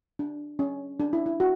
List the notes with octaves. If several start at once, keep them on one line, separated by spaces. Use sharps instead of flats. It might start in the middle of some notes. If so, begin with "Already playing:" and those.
D4
C#4
D4
E4
E4
F#4